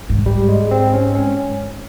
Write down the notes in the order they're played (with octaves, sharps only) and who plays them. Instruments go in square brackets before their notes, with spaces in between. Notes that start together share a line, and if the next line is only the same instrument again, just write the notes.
[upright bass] G#2
[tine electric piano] G3
G#3
C4
C#4
C#4